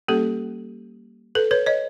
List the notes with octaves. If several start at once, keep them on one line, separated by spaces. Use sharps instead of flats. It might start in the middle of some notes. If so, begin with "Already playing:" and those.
G3 A#3 C#4 G4 A4
A4 B4
B4 C#5
C#5 D#5